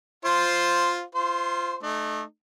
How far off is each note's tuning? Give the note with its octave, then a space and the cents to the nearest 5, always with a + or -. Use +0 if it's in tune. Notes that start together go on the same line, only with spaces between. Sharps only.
F4 +0 C5 +0
F4 -20 C5 -15 C6 +15
A3 -20 D#4 -40